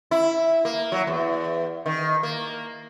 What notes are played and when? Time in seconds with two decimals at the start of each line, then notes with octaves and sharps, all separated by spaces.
0.11 E4
0.65 A#3
0.92 F#3
1.07 E2
1.86 D#3
2.23 A#3